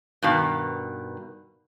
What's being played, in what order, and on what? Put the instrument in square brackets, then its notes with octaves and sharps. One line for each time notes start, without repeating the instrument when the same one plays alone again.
[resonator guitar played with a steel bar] G2 B2 D#3